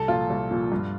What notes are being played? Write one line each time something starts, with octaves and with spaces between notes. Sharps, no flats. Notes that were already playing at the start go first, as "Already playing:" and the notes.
Already playing: C2 A4
A#2 F3 F4
C2
A#2 F3
G2